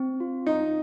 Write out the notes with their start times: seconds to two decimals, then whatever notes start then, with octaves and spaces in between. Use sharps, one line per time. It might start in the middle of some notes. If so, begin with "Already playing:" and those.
Already playing: C4
0.20 F4
0.46 D#4 D#5